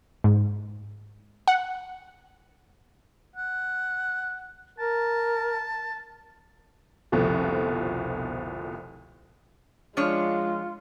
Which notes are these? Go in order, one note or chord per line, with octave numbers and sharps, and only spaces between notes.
G#2
F#5
F#5
A#4 A5
F1 C2 B2 D3 F3
F3 G#3 D4 F4 C#5